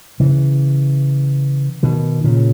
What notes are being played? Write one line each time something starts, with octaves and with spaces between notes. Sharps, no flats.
C#3 E3
B2 D#3
A#2 C#3